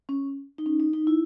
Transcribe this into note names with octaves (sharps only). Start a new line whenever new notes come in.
C#4
D#4
C#4
D#4
D#4
E4